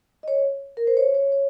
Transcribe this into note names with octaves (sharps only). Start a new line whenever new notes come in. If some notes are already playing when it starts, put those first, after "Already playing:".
D#5
C#5
A#4
C5
C#5
C#5
C#5